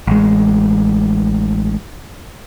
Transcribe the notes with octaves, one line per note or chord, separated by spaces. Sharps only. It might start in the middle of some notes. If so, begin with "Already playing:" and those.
A1 G#3